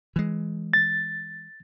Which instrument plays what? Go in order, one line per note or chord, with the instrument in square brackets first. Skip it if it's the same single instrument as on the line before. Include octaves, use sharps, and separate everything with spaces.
[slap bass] E3 G#3
[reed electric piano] A6